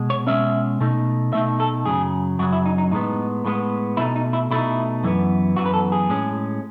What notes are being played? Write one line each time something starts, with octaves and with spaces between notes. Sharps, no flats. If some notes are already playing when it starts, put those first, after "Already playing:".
Already playing: B2 G#3
C#5
B2 G#3 C#4 E5
B2 A3 D#4
B2 A3 D#4 E5
A4
F#2 C#3 F#3 G#4
F#2 C#3 F#3 F#4
E4
D#4
D#4
A2 G#3 B3 D#4
A2 G#3 B3
B2 A3 D#4 E4
D#4
E4
B2 A3 D#4 E4
F#2 E3 B3
F#2 E3 B3 F#4
B4
A4
G#4
A2 G#3 C#4